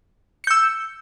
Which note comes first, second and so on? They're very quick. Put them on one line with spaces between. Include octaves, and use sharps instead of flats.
C#7 G6 E6